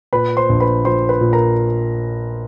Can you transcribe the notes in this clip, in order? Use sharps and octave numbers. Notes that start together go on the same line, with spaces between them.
A#2 B4 B5
C5 C6
A#1
B4 B5
F3 C5 C6
B4 B5
A#2
A#4 A#5